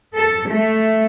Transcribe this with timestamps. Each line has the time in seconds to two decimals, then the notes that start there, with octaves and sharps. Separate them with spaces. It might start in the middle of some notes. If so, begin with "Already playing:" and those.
0.14 A4
0.48 A3